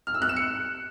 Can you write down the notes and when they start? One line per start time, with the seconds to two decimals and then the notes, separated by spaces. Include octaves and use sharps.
0.07 F6
0.14 E6
0.22 F#6
0.29 E7
0.36 C#7